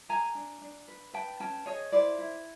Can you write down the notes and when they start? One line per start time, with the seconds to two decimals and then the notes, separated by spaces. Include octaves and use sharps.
0.09 G#4 G#5 A#5
0.35 D4
0.61 D4
0.88 B4
1.13 B4 G5 A5
1.40 C#4 G5 A5
1.66 G#4 C#5 D#5
1.92 E4 C5 D5
2.18 E4